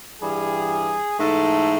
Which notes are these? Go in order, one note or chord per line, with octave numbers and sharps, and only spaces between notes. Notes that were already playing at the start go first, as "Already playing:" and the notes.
G2 E3 G3 G#4
G#2 E3 A3 A4